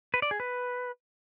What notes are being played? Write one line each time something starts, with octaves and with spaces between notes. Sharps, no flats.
B4
D5
G#4
B4